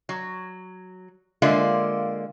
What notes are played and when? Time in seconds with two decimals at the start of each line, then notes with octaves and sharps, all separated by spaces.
0.09 F#3
1.42 D3 G#3 A#3 F4 D5 E5